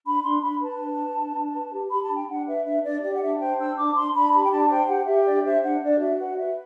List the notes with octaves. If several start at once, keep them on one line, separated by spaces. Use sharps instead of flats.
D4 B5
D4 C6
D4 B5
B4 A5
D4
B4
D4
D4
B4
G4
G4 B5
A5
D4
G5
D4 F#5
B4 E5
D4 E5
D4 D5
G4 D5
F#5
D4 E5
C5 G5
D4 E6
D4 D6
D4 C6
D4 B5
G4 B5
G5
D4 A5
C5 G5
G4 F#5
G4 E5
D4 D5
C5 E5
D4 F#5
D4 D5
F#4 E5
B4 F#5
D5
B4 E5